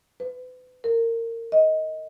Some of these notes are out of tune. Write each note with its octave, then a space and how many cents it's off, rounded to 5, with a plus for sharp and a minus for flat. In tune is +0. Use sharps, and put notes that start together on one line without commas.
B4 +35
A#4 -25
D#5 +15